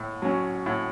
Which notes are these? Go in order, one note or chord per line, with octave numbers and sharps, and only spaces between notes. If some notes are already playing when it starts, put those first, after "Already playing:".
Already playing: A2
F#3 C#4
A2